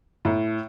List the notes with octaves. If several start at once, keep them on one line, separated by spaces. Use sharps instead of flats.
A2